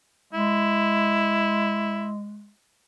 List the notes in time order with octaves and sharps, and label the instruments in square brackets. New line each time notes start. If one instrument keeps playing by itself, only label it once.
[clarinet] G#3 [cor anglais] E4